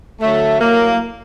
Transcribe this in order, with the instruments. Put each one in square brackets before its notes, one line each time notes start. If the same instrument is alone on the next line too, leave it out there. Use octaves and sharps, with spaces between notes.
[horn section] D3 F#3 A3
A2 F#3 A#3